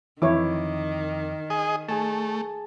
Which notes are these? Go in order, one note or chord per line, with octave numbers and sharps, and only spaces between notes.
F2 D#3 E3 E4 C#5 D6
G#4 D#5
A3 G#4 G#5 A5